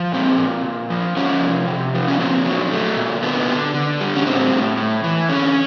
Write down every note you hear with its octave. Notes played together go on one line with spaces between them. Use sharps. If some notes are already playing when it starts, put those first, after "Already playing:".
Already playing: F3
A#2 C4
A#2
A#2
F3
F3 C#4
C3
C3
F3
C#4
A#2 C4
F#3
A3
A#2
D3 B3
D3
D3
G3
C#4
A2 C4
A2
A2
E3
D3 C#4